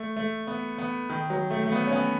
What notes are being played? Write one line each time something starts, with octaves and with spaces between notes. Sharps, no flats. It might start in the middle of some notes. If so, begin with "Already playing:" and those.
Already playing: A3
A3
B3
B3
D#3
F#3
A3
A3
B3
C#4
B3